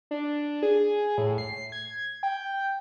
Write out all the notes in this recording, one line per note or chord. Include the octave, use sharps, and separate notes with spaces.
D4
G#4
A2
C7
G#6
G5